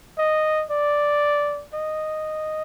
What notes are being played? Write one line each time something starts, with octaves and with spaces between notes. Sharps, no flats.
D#5
D5
D#5